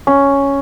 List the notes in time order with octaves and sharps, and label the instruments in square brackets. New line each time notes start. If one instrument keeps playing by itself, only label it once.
[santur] C#4